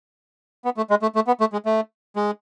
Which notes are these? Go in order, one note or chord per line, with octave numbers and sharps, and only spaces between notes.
B3
A3
G#3
A3
A3
B3
A3
G#3
A3
G#3